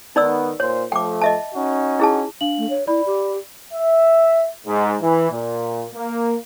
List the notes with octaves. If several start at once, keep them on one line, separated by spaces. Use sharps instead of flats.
D#3 B3 D#4 D5 E6
A#2 C5 C#5
F3 A3 G5 D6
D#5 E5 A5
C#4 D#4 F#4
E4 G#4 A5
D4 F5 F#7
A3
C#5
E4 D5 B5
G4
E5
G#2
E3
A#2
A#3